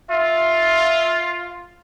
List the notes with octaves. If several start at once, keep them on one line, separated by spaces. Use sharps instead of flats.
F4 E5